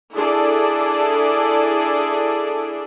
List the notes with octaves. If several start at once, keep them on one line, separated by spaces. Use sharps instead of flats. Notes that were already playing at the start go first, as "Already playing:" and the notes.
D4 E4 G#4 A4 D5